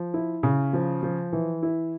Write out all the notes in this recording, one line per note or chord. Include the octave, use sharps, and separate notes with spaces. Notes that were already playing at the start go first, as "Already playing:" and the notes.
Already playing: F3
E4
C#3
F3
F3
E3
E4